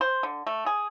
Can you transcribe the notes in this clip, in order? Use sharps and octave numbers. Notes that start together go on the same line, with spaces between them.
C5
D3
A3
G#4